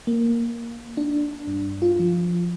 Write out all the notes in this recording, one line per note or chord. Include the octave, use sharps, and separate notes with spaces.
A#3
D4
G2
F4
F3